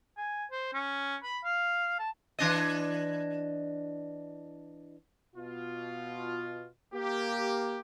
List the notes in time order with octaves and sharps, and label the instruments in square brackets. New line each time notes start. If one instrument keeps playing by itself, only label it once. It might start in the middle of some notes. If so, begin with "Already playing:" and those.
[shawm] G#5
C5
C#4
B5
F5
A5
[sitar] E3 D4 D#5
[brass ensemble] B2 F4
A#3 G4